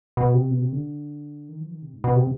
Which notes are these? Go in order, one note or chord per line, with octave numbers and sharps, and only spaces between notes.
B2
C3
B2
C3
D3
D#3
F3
D#3
C3
G#2
B2
C3